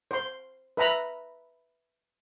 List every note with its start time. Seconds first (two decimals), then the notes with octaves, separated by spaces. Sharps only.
0.11 C5 C6
0.77 B4 E5 A#5 B5